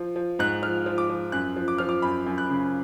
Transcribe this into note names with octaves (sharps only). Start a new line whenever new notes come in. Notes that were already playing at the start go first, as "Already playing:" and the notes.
Already playing: F3
F3
G#2 F#6
F3 F6
F3
D6
F3
F#2 F#6
F3
D6
F3 F6
D6
F#2 B5
F#2
F#6
C#3